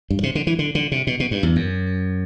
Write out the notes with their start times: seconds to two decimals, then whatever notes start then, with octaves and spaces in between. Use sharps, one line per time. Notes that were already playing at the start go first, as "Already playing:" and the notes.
0.10 G2
0.23 C3
0.35 D3
0.47 E3
0.59 D3
0.75 D3
0.92 C3
1.07 B2
1.20 B2
1.31 G2
1.43 E2
1.56 F#2